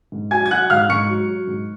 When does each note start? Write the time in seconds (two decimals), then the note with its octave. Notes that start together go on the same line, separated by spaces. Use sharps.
0.12 G#2
0.31 F#3 G#5 G#6
0.46 G#6
0.51 F#3 F#5 F#6
0.70 G#2 F5 F6
0.89 G#2 C#6 C#7
1.09 F#3
1.28 F#3
1.47 G#2